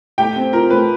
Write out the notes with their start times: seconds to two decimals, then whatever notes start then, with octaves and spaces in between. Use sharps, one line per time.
0.18 A3 G4 G5
0.36 C4
0.53 F4 A#4
0.70 A3 B4